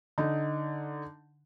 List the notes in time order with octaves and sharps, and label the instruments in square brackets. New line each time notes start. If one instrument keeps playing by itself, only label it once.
[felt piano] D3 D#4